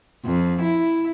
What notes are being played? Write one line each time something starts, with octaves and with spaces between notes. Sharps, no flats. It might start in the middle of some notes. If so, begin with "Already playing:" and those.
F2
E4